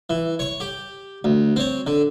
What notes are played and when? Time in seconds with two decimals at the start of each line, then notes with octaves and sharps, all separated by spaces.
0.10 E3
0.39 C#5 C#6
0.60 G4
1.24 D2
1.56 C4 C#5
1.87 D3